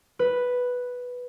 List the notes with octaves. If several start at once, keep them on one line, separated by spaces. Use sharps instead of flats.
B4